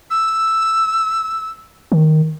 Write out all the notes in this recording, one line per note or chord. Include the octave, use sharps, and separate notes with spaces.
E6
D#3